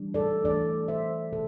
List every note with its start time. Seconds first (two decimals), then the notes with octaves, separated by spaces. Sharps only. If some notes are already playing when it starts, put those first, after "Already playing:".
Already playing: E3 G3 D4
0.14 A4 D5
0.44 E3 A3 D4 A4 D5
0.88 C5 E5
1.32 C3 A4